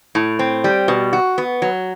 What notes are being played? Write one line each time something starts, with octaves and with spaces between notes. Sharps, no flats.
A2
C4
G3
B2
F#4
B3
F#3